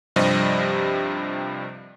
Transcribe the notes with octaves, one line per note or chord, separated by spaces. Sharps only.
G2 C3 F3 G3 C4 D#5